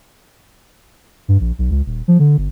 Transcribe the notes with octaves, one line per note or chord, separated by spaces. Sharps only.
G2
A#1
B1
C#2
D#1
F3
D3
G1